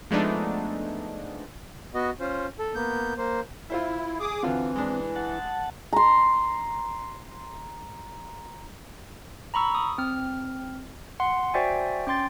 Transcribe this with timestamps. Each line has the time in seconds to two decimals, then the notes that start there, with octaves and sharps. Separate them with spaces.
0.11 F3 G#3 A3 B3 D4 D#4
1.94 B3 F#4 D#5
2.20 C#4 F4 C5
2.59 A4
2.75 A#3 B3 G6
3.17 A#3 C5
3.70 E4 F4 C5 E5
4.20 G#4 D6 D#6
4.43 D3 E3 C4 F4 F#4
4.76 G#3 D4
5.16 F#5 A5
5.93 A#5 C6
9.54 A#5 B5 C#6 E6
9.75 D#6
9.98 C4 F6
11.20 F#5 C6
11.54 F#4 C5 D5 E5 G5 G#5
12.07 C#4 G5 C6 A6